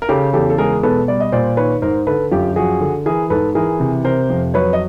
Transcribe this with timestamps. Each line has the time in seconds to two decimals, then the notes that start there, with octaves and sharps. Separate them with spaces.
0.02 A#4
0.09 C#3 G4 A4
0.33 E2 G4 A4
0.50 A4
0.58 G#3 G#4 A#4
0.83 B2 A4 B4
1.08 G3 D5
1.20 D#5
1.32 A#2 C5 D5
1.57 D#3 B4 C#5
1.82 G#2 A#4 C5
2.07 D3 A4 B4
2.31 F#2 F4 G4
2.56 F3 F#4 G#4
2.81 D3
3.06 E3 G#4 A#4
3.30 G#2 A4 B4
3.55 E3 G#4 A#4
3.80 C3
4.04 C3 A#4 C5
4.30 F2
4.54 F#3 B4 C#5
4.73 D#5